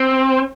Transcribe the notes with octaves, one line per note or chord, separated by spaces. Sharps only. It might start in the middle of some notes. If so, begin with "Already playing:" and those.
Already playing: C4